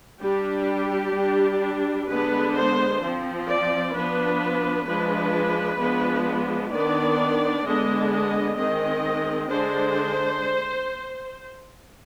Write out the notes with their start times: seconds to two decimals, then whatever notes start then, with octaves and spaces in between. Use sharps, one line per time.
0.21 G3 D4 G4
1.14 G3 D4
2.08 D3 G#3 B3 D4 B4
2.55 C5
3.01 F3 C4
3.47 D5
3.93 F3 B3 D4 B4
4.86 F3 G#3 D4 B4
5.79 F3 G#3 B3 D4
6.72 D#3 B3 D4 D5
7.65 D3 G#3 B3 D4 D#5
8.11 D#5
8.57 D#3 G#3 C4 D#5
9.50 D3 G#3 D4 C5